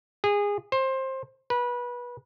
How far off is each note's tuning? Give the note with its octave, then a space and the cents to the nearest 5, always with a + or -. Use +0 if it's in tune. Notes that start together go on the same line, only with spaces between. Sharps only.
G#4 -25
C5 +20
B4 -25